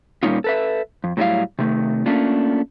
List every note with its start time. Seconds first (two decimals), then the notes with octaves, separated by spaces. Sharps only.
0.23 A#2 G3 A#3 C#4 D#4 F4
0.44 A4 B4 E5
1.04 F2
1.17 A2 E3 F#3 G3 E4 F5
1.59 C3 D#3 A3
2.06 A3 A#3 C#4 D4 F4